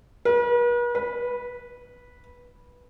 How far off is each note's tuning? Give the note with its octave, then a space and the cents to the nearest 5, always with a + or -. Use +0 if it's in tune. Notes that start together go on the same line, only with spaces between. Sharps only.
B4 -45
B4 -10